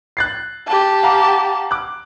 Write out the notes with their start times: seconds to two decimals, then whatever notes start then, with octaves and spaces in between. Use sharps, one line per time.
0.17 F#6 A6 C7
0.68 G4 A5
1.03 F5 F#5 A#5
1.71 D6 F#6